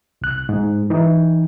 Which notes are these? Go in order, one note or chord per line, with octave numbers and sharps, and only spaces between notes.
C2 F#6
G#2
E3 D#4